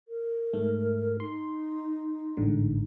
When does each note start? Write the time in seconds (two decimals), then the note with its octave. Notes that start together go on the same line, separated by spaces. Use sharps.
0.08 A#4
0.53 G#2 A3
1.20 D#4 C6
2.37 A1 G#2 D3